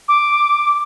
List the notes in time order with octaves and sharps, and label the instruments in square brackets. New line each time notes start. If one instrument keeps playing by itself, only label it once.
[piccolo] D6